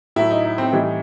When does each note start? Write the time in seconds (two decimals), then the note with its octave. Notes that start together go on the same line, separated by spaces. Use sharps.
0.16 A2 F#3 E4
0.31 D#4
0.45 D#4
0.58 C4
0.73 A2 E3 G3 D#4